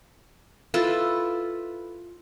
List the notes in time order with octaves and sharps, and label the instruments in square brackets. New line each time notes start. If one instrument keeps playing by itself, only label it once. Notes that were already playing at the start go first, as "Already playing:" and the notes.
[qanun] E4 F4 A4 B4